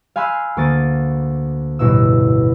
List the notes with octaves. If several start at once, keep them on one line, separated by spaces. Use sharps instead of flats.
F5 G#5 B5 C6 E6 F#6
D2 A#3 C#6 D#6 A6
A1 G2 B2 E4 E6